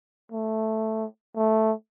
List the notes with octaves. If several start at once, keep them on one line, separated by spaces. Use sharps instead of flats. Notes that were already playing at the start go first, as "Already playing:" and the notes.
A3
A3